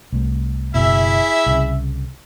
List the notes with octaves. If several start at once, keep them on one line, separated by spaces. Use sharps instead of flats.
C2 A3
F#1 B2 E4 G#4 E5
C2 C#3